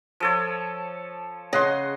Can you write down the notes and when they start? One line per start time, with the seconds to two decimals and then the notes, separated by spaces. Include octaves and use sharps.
0.20 F3 A4 C#5
1.53 C#3 D#5 F#5 C6